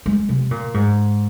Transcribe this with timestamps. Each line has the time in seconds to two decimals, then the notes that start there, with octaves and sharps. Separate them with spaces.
0.06 G#3
0.29 C3
0.51 A#2
0.74 G#2